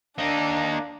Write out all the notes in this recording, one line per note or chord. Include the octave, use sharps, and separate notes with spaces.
A#3 D4 D#4